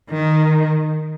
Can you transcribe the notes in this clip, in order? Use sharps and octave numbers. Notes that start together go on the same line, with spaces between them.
D#3